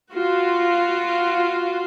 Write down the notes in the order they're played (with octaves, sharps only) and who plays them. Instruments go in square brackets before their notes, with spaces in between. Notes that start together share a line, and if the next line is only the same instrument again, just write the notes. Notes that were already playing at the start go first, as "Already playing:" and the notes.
[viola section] F4 F#4